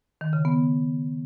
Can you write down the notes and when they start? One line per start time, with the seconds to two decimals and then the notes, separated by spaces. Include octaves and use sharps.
0.21 D#3
0.33 C#3
0.45 B3